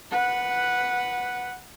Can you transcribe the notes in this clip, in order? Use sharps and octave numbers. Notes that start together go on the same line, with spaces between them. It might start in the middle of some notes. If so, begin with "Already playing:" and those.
B4 F#5